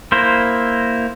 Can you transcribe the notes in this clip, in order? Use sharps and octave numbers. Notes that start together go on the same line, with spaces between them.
A#3 E4 C5